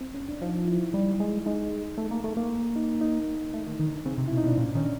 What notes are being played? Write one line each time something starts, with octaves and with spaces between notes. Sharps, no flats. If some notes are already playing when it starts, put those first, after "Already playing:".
C4
C#4
D4
F3 D#4
E4
G3
G#3
G#3 D#4
A3
A#3
A3
A#3
D#4
D#4
A3
D#3
D#3
D3
C#3 C4
C3
B2 E4
D#4
B2 D4
A#2 C#4
D#3 C#4
D4